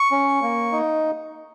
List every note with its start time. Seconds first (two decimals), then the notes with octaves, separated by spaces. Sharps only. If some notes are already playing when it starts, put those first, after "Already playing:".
Already playing: C#6
0.11 C#4
0.42 A#3
0.72 D#4